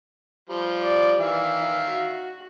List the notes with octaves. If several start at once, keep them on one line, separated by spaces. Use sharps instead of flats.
F3 G3
D5
D#3 E3 E5 F5
F#4